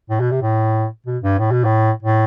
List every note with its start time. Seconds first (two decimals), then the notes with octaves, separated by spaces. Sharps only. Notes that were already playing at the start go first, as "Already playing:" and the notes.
0.10 A2
0.20 B2
0.31 C3
0.42 A2
1.07 B2
1.23 G2
1.39 A2
1.52 B2
1.64 A2
2.03 A2